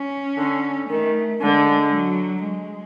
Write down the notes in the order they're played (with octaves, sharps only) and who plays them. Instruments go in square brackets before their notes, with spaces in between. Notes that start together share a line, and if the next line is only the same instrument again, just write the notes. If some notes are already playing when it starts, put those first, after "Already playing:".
Already playing: [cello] C#4
[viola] D3
[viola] D#3 [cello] A3
[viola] D3 [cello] G#3
[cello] F#3
G#3